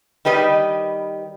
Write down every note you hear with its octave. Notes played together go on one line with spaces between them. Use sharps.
D#3 G3 B4 D#5